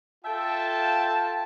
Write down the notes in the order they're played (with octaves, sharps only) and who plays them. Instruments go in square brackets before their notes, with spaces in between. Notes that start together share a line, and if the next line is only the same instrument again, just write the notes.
[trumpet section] F4 A5 [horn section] A4 E5 G5